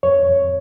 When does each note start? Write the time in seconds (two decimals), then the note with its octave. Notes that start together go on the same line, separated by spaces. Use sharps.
0.03 F2 C#5
0.28 F2